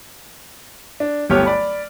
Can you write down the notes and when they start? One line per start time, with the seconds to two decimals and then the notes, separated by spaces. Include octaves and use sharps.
1.00 D4
1.29 D1 G1 B3 G4 C#5 F6
1.46 D5 B5